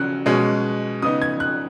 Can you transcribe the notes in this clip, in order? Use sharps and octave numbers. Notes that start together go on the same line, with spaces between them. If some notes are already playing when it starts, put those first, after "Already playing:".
Already playing: C#3 F#3 C#4 F#6
B2 G#3 C#4
C#3 B3 D#4 D#6
G#6
F#6